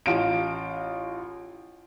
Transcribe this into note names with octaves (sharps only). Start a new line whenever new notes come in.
A1 F4 D7